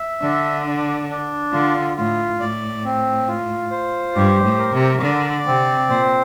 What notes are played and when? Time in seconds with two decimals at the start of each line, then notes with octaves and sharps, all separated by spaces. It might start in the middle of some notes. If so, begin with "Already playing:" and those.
Already playing: E5
0.22 D3 D4
0.67 D4
1.09 D4
1.53 D3 F4
1.97 A2 F4
2.40 A2 D5
2.85 C4
3.28 F4
3.71 C5
4.15 G2 G4
4.43 A2
4.58 A#4
4.74 C3
5.02 D3 D5
5.46 C3 C4
5.89 A#2 C5